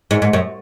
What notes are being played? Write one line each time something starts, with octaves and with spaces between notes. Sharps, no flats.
G#2
G#2
F#2